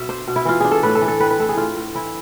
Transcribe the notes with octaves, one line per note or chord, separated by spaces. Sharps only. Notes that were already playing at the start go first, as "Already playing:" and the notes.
Already playing: B2 E5
D4 C5
B2
E4
E3 F4
D4 G#4
A4
A2 B4
A4
E3
A4
C4 B4
B4
A2 A4
G#4
A2 F4
A2
E3 E4